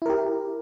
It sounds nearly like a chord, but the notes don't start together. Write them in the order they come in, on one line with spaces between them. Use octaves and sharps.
E4 A#4 G4